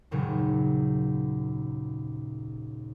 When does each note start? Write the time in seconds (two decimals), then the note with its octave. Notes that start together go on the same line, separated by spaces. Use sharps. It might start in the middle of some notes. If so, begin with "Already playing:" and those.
0.11 F#1 D#2 A#2 C#3 F#3